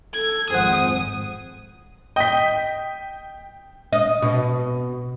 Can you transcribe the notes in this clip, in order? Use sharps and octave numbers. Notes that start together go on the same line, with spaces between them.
A4 G#6
G#1 F2 G#4 C5 F#5 D#6
D#5 G5 B6
D#5
B2